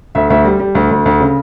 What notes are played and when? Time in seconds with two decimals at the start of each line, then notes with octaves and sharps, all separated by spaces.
0.15 D2 E5
0.30 D2 E5
0.45 G3
0.59 G3
0.75 D2
0.91 D2
1.06 D2
1.21 C#3